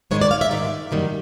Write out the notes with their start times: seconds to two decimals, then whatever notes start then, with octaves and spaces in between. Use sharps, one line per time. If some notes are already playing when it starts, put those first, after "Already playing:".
0.11 G#2 D#3 G#3 C#5
0.21 D5
0.31 F5
0.41 E5
0.51 G#2 D#3 G#3 D5
0.91 F#2 D#3 G3 A#3